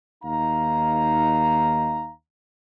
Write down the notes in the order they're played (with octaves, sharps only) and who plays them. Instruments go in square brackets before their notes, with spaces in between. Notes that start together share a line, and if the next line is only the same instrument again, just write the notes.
[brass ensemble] D#2 D#4 F5 A#5